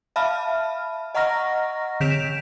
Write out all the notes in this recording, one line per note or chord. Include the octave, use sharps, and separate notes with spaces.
E5 F5 A5 B5 F6
D#5 F#5 A#5 C#6 F6 A#6
D3 G6 B6 D7 E7 F7